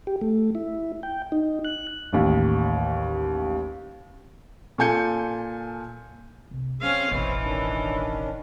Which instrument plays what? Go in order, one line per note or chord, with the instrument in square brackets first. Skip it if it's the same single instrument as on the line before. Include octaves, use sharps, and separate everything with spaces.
[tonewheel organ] G4
A3
E4
G5
D#4
F#6
[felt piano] A1 D#2
A#2 A4 G#5 G6 C#7
[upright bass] C2
[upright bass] F#3 [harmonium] C4 G#4 [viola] C#4 F5
[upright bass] E1 A1 [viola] E3 [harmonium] C5 C#5 D#5
[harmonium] D#3 C#4 D4